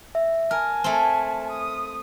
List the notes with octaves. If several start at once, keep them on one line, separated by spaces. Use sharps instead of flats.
E5
A#4 G#5 A5 F6
A3 C4
D#6